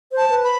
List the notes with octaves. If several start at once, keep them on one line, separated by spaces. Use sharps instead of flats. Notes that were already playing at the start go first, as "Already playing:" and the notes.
C5
A5
B4
B5